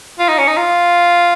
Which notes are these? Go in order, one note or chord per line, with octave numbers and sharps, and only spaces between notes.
F4
D#4
C#4
D#4
F4